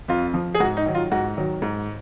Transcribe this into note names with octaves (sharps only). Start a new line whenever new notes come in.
F2 F4
F3
G#4
G#2 F#4
D#4
D#3 F#3
F4
G#2 F#4
D#3 F#3
G#2